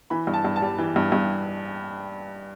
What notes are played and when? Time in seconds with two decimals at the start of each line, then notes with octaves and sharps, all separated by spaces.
0.10 E3 B5
0.27 G2
0.34 A5
0.45 G2
0.56 A5
0.62 G3
0.78 E3
0.96 G2
1.12 G2